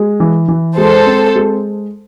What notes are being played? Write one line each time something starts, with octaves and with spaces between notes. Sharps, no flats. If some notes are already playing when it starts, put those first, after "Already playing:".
Already playing: G#3
E3
E3
G#3 A4 C5
C4
G#3